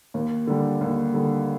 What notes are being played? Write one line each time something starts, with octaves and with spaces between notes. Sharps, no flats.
D#2
D3 G3
D#2
D3 G3